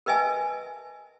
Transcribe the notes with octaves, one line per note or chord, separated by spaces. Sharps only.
A#4 B4 D#5 E5 G#5 A5